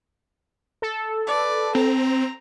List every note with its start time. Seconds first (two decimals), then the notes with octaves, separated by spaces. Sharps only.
0.82 A4
1.27 B4 D5
1.75 C4 A#5